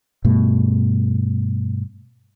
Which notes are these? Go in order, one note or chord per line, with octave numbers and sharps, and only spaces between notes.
G2 B2 A3